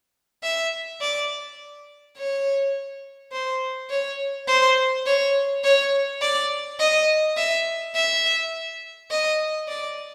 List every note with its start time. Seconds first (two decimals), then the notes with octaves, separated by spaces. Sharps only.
0.43 E5
1.01 D5
2.16 C#5
3.32 C5
3.90 C#5
4.47 C5
5.06 C#5
5.64 C#5
6.21 D5
6.79 D#5
7.37 E5
7.95 E5
9.10 D#5
9.68 D5